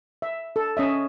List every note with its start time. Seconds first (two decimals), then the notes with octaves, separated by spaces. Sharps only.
0.22 E5
0.56 A4
0.77 C#4 D#5 E5